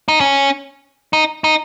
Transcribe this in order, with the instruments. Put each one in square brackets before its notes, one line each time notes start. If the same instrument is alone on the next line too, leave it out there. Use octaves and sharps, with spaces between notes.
[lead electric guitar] D#4
C#4
D#4
D#4